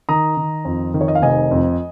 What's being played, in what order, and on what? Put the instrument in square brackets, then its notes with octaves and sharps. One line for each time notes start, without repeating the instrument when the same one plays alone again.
[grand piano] D#3 A#5 D#6
D#3
F2
D#3
C#5
D#5
F5
F1 D#5 G#5
F2